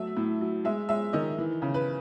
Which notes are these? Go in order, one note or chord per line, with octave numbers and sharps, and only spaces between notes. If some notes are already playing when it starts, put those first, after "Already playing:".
Already playing: F#3 A3 E5
A2
F#3
G#3 E5
G#3 E5
D#3 D#5
E3
C#3
B4